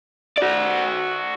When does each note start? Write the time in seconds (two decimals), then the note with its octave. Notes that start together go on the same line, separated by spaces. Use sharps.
0.38 F#4 D5